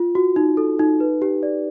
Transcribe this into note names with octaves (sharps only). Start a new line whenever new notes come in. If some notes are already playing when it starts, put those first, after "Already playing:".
Already playing: F4
F#4
D#4
A4
D#4
B4
G4
D5